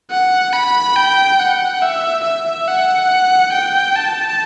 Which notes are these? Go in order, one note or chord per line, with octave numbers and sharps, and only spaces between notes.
F#5
B5
G5
F#5
E5
E5
F#5
G5
A5